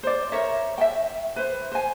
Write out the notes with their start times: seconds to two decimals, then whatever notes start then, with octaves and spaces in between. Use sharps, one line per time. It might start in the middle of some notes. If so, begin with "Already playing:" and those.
0.03 C5 D5
0.32 A#4 C#5 E5
0.78 E5 G5
1.36 B4 C5
1.72 C5 G#5